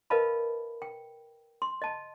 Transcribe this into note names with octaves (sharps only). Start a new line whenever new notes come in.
A#4 B4 D#5 F5 A5 B5
G5
C6
D#5 A5